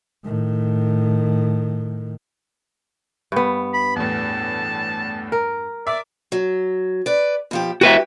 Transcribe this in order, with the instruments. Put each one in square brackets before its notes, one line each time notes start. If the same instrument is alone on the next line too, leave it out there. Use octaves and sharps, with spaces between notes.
[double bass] A2 D#3
[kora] G2 B3
[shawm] B5
[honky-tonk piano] E2 A2 [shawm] A5
[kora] A#4
[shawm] D5 [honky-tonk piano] E5 D6
[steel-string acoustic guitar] F#3
B4 D5
B2 F3 G4
[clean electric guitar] F#4 B4 E5 [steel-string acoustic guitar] G4